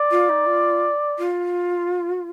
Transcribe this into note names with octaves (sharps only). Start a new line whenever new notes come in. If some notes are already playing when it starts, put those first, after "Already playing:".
Already playing: D5
F4
D#4
F4
F4